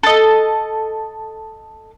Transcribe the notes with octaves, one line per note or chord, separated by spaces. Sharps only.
A4 D#5